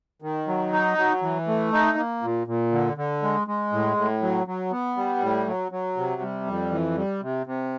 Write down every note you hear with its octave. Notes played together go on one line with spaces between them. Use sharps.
D#3
F#3
D#4
F#3
E3
A3
D#4
A#3
A#2
A#2
D3
D3
G#3
G#3
A2
A2
F#3
F#3
B3
G3
A2
F#3
F#3
C3
G3
F2
E3
G3
C3
C3